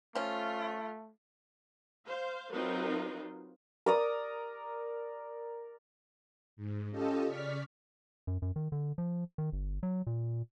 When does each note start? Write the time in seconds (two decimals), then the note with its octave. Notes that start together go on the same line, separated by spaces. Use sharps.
0.15 F3 A3 C#4 F4
2.08 C5 F5
2.51 F#3 C4 D#4 F4 A#4 B4
3.86 A#4 D5 D#6
6.56 G#2
6.91 C#4 F4 G4 A4 D#5 A5
7.27 C#3 D5 C#6 F6 B6
8.27 F#2
8.42 F#2
8.56 D#3
8.72 D3
8.98 F3
9.38 D#3
9.52 G1
9.83 F#3
10.07 A#2